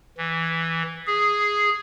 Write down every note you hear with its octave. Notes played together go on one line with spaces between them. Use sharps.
E3
G#4